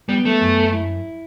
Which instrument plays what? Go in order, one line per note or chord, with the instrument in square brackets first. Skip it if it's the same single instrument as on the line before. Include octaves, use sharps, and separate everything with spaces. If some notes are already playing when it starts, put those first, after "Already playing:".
[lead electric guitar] G3 [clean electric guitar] B3
[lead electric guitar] A3
[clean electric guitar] F#2
E4